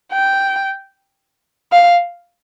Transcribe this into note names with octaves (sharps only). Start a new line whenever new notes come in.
G5
F5